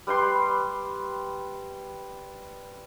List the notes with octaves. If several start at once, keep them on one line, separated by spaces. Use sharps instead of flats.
G3 B4 G5 C6